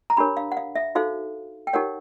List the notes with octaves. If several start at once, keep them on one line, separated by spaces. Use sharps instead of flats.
A#5
D4 G4 A#4 C#5 B5
F5
F#5
F5
E5
D#4 F#4 A4 C5 F5
G5
D#4 G4 A#4 C#5 F#5